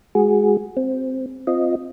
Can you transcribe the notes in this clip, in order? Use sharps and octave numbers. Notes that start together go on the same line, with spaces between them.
G#3 F#4 G#4
C4
C4 F4 D#5